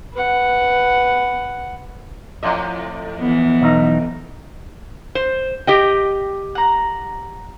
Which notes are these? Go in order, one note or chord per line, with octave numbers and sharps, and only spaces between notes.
B4 F#5
F2 A2 D#5
E3 B3
B1 E2 D#4
C5
G4 D#5 G5
F#5 A#5